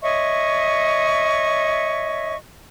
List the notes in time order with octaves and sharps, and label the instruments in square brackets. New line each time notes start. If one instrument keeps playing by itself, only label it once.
[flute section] C#5 D#5 E5 C#6